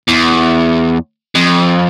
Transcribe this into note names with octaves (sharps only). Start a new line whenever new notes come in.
E2
F2